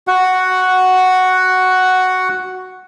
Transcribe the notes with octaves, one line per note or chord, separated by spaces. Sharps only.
F#4 F#5